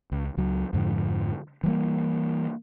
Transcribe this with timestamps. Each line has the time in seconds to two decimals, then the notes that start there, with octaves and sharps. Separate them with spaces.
0.12 C#2
0.37 C#2 F#3
0.73 F2 G#2 D3 F3
1.63 E3 G3 A#3